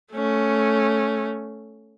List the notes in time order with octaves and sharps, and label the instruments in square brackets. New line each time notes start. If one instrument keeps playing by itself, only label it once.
[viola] A3 C#4